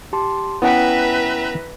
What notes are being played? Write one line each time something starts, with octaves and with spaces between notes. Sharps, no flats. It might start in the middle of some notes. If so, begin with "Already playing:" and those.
G4 A5 C6
B3 C#4 E4 B4 E5 F#5 G5 A#5